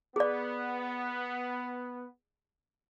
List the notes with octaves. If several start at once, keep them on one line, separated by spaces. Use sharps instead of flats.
B3 G#4 D5